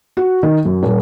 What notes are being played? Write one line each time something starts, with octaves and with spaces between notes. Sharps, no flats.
F#4
D#3
F#2
D#1